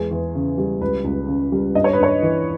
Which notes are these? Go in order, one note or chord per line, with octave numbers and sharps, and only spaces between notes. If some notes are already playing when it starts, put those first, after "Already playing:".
Already playing: E2 G#3 G#4
E2
C#3
G3
C#2 B4
C#2
C#3
G3
G2 D#5
C#5
B4
G2 C#5
E3